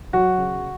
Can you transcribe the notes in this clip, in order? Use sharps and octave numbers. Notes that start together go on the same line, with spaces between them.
F#3 F#4
C#3